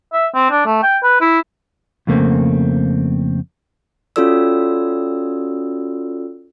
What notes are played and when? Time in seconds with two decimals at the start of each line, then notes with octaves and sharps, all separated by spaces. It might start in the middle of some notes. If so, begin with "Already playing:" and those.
0.13 E5
0.34 C4
0.51 D4
0.66 A3
0.83 G5
1.03 B4
1.21 E4
2.07 F2 C#3 A3 A#3 C4
4.16 C#4 F4 F#4 A4 D5 E6